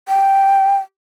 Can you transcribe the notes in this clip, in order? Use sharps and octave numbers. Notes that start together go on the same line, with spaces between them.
G5